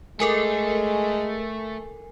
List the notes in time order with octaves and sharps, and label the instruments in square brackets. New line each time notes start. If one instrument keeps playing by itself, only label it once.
[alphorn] G#3 [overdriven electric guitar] A3 [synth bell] A4 A#4 G#5